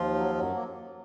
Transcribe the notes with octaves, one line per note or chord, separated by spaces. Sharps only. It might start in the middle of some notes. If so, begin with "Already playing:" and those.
Already playing: D#2 F3 F4
F#3
F#2 F#3
A#3